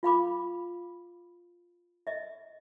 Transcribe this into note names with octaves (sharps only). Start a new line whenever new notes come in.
F4 F5 B5 D6
D#5 E5